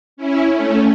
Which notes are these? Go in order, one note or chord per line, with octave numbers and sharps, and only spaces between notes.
C#4 E4
A3 C#4